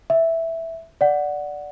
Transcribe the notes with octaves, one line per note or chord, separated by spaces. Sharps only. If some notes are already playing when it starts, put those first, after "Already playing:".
E5
D5 F#5